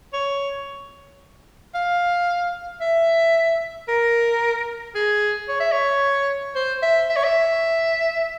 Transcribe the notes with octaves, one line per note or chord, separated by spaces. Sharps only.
C#5
F5
E5
A#4
G#4
C#5
E5
C#5
C5
E5
E5
C#5
E5